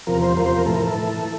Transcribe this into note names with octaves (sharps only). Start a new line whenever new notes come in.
E2 C3 F3 A#4
C5
E2 C3 F3 A#4
C5
A#4
A2 E3 A4
A#4
A4
A2 E3